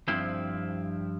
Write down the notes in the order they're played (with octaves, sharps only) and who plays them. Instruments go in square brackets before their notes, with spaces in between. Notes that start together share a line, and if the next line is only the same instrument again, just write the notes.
[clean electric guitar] G2 F3 C4 E4